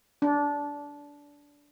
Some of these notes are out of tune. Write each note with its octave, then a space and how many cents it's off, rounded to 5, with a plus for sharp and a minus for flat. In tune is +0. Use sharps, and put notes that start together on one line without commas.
D4 -20